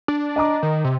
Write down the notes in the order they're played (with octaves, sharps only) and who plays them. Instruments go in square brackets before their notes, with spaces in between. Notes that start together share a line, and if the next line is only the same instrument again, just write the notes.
[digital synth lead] D4
[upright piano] D#5 A#5 D6
[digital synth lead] D#3
C3